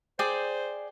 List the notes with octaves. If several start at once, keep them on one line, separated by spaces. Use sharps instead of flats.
G#4 C5 D5 G5